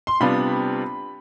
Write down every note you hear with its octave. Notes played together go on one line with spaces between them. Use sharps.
C6
C3 G3 B3 D4 F4 B5